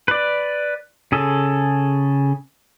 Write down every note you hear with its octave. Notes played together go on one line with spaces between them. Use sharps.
B4 D5
C#3 G#4 A4